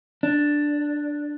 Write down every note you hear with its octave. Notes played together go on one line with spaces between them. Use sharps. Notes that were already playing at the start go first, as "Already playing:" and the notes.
D4